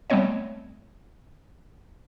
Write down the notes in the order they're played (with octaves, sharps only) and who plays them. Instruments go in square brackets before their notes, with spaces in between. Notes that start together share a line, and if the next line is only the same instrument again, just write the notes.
[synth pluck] G3 A3 B3 C4 C#5 D#5